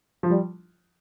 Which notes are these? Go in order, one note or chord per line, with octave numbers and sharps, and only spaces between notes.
F3
G3